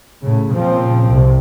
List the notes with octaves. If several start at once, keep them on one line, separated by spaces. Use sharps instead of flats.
A2 C#3
A#2 C#3 F3 C4
C2 C3